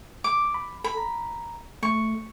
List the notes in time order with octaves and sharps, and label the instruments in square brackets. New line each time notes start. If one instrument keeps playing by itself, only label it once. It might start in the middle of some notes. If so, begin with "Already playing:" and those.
[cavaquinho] D6
[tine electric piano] B5
[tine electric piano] A4 [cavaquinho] B5
[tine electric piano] A#5
[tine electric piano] A3 [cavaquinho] C#6